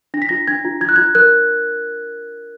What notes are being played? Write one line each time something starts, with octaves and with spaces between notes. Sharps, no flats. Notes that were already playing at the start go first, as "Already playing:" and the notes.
D4 A#6
B6
F4 A#6
D4 G#6
F4
F4 G#6
F#6
F4 G#6
A#4 F#6